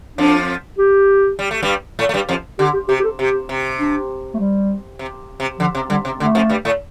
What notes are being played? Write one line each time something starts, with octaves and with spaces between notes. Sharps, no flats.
F2 F3 D4
G4
G3
A3
G2 G3
A2 A3
A3
G2 G3
F2 F3
D3 G4
G4
C3 G4
G4
A4
C3 G4
C3
D4
A3
G3
C3
C3
D3 F3
C3
D3 G3
C3
D3 A3
F2 F3
G2 G3
A2 A3